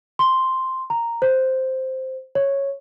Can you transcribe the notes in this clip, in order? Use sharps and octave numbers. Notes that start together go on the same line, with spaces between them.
C6
A#5
C5
C#5